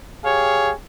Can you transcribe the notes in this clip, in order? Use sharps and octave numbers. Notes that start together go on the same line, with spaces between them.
G4 G#4 C#5 F5